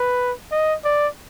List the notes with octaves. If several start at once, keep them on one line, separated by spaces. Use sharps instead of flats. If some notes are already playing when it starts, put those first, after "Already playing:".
Already playing: B4
D#5
D5